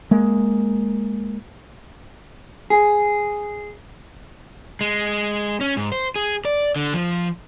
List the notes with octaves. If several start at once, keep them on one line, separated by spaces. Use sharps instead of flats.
G#3 A#3
G#4
G#3
C#4
G#2
C5
G#4
D5
D3
F3